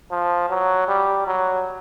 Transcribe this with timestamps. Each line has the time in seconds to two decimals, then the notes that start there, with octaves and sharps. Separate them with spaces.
0.11 F3
0.50 F#3
0.88 G3
1.27 F#3